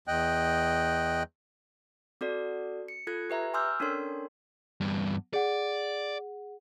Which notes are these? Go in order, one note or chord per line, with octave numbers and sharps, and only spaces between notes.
E2 D#5 G5 F#6
C4 F#4 A4 D5
C#7
F4 A4 F#6 G#6
G4 B4 E5 A#5
G#5 C6 D6 E6 F6 G6
C#4 D4 A4 A#4 C#5 C6
E2 G2
G#4 D5 F#5